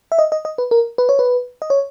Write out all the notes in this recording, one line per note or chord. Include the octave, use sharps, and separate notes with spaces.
E5
D#5
D#5
D#5
B4
A#4
B4
C#5
B4
D#5
C#5